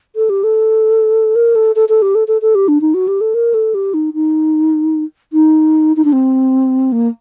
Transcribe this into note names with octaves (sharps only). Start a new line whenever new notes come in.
A4
G4
A4
A#4
A4
A4
A4
G4
A4
A4
A4
G4
D4
D#4
F#4
G4
A4
A#4
A4
G4
D#4
D#4
D#4
D#4
D4
C4
A#3